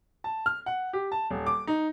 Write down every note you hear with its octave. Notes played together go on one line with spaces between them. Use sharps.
A5
F6
F#5
G4
A5
D#1
D6
D#4